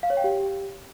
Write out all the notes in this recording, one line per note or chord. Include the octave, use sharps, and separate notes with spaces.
F5
C#5
G5
G4